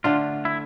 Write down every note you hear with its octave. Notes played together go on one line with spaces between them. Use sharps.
D3 A3 D4 F4
E4